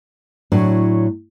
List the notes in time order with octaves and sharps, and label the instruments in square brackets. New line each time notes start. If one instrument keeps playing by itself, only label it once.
[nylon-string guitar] A2 F#3 D4